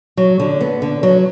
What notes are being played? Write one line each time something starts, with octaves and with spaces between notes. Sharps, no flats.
F#3
D3
B3
D3
F#3